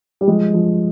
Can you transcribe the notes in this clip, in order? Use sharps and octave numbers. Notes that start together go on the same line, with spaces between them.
G3
F3 G#3
F3